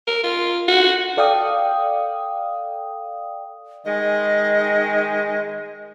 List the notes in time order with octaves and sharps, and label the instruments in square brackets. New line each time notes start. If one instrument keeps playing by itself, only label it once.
[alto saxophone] A#4
F4
F#4
[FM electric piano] A4 D5 F5 G5 D#6
[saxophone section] D#3 G#3 [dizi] D#5